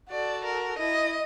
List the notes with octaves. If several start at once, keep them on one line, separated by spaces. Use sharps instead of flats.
F#4 A4 D5
A#4
E4 D#5